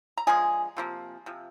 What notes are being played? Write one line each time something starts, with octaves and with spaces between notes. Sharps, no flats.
A#5
D3 F3 G#3 G#4 G#5
C3 F3 A#3
C3 F3